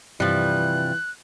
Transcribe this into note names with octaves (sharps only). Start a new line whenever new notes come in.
G2 C3 E3 F3 G3 F#6